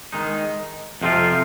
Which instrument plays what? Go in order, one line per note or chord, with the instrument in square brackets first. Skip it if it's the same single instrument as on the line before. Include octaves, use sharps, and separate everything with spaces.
[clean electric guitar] D#3 G#3 D#4
F2 C3 F3 C4 F4